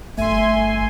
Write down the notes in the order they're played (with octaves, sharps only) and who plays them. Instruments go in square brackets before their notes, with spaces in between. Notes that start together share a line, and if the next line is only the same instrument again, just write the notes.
[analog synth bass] G1 [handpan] A3 [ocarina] E5 [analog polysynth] G#5 C6